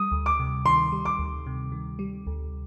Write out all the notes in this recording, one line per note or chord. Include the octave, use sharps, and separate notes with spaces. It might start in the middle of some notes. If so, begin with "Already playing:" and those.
Already playing: G3 D#6
D2
D6
C3
D#3 C6
G3
D6
D2
C3
D#3
G3
D2